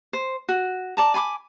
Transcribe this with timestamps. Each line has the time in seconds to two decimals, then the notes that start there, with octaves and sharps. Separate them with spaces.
0.13 C5
0.49 F#4
0.97 D5 A5 A#5
1.14 G#5 B5 C6 D6